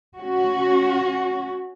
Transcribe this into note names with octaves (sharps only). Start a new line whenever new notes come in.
C#4 F#4